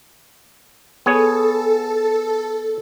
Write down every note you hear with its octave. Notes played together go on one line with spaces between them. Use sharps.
B3 G#4 A4 C#5